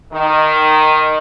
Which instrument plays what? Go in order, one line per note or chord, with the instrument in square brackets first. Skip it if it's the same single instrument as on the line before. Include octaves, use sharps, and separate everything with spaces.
[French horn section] D#3